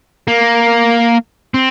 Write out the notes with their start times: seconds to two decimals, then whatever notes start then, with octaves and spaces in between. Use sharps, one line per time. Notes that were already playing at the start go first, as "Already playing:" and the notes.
0.28 A#3
1.54 C4